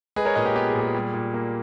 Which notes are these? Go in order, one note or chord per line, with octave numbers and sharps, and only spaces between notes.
G#3 G#4 B4
A#4 C#5
A#2 B4 D#5
G4
B3 G4
G#4
A#2
G#4
G3
A#2
A#3